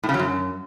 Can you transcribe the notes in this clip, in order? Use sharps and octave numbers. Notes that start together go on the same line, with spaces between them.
A2
C#3
F#3
F#2